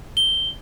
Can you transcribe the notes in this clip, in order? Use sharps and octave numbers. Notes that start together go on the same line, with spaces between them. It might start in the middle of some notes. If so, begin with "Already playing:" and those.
G7